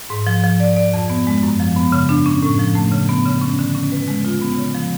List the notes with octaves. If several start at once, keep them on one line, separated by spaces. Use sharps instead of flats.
G#2
F3
F3
D5
D5
F2
B3
G#3
F#2
F3
B3
C#3
D4
C#4
A2
F3
A3
C#3
B3
C#3
C#4
D3
C#4
B4
G#3
F4
B3
C#3
F3